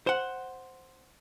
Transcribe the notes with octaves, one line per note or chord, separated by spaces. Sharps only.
C5 F#5